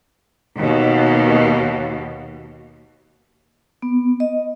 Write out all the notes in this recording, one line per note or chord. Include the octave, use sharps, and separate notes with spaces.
D#2 B2
B3
D#5